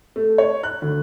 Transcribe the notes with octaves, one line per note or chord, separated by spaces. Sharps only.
A3
C#5
F#6
D2